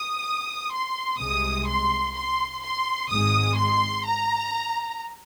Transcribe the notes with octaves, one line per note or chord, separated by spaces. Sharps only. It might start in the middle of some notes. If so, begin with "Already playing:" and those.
Already playing: D#6
C6
C2 C3 G#3 D#6
C6
C6
C6
G#1 G#2 G#3 D#6
C6
A#5